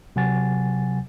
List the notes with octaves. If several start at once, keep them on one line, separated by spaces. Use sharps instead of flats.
C3 F#3 F#5 G#5 A6